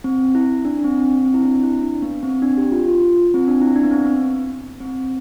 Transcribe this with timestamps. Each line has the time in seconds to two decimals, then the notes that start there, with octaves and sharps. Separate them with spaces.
0.04 C4
0.35 E4
0.65 D4
0.79 D4
0.84 C4
1.03 C4
1.24 C4
1.34 E4
1.43 D4
1.63 E4
1.82 D4
2.02 B3
2.23 C4
2.42 D4
2.57 G4
2.72 F4
2.88 F4
3.34 C4
3.48 D4
3.61 E4
3.76 D4
3.84 B3
3.91 C4
4.05 B3
4.81 C4